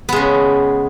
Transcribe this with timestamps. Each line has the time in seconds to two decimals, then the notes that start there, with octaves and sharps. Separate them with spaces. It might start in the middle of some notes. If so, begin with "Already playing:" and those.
0.09 B3
0.12 G#3
0.16 C#3